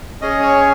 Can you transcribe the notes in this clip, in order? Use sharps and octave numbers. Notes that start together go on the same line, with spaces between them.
C#4 G#4 D#5
C#5